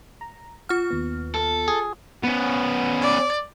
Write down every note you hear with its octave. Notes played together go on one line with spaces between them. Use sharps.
A#5
F4 F#5 F6
D#2 B3
A4
G#4
B3 C#4
D5